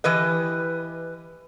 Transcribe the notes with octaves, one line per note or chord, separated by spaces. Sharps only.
E3 G4 B4 D#5